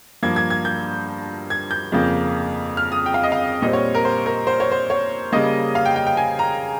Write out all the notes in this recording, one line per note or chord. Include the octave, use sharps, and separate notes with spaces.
G2 F3 A#3 G#6
G#6
G#6
G6
G#6
G6
F2 C#3 F3 A#3
F6
D#6
G5
F5
D#5
F5
A#2 G3 C4 D#5
C#5
A#4
C5
A#4
C5
C#5
C5
C#5
C#3 G3 A#3 D#5
F5
G5
G5
G5
G#5
A#5